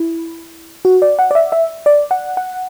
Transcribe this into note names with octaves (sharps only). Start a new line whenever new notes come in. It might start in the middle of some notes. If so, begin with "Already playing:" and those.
Already playing: E4
F#4
D5
F#5
D5
E5
E5
D5
F#5
F#5